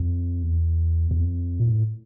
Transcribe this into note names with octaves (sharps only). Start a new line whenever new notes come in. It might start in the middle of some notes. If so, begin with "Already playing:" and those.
Already playing: F2
E2
E2
F2
A#2
A2